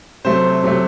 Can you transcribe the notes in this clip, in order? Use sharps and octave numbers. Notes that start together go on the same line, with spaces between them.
C3 F#3 A3 C5
C3 F#3 A3